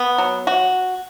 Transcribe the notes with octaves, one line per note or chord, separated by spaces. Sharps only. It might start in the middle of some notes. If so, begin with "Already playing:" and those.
Already playing: B3
F#3
F#4